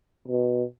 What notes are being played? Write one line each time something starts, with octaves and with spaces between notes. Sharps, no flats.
B2